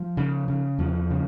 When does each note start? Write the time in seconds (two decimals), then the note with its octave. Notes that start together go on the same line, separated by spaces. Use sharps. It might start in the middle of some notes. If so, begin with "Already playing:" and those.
Already playing: F3
0.17 C#3
0.48 C#3
0.78 E2 F3
1.10 C#3